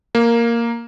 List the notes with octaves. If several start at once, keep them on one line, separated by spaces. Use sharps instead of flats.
A#3